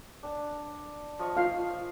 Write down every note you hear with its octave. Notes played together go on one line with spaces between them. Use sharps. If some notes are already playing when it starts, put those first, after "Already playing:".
D4 A5
F3 D#5 C#6
F4 F5